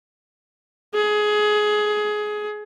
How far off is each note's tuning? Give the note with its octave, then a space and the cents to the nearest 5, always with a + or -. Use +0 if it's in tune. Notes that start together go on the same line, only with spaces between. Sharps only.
G#4 +20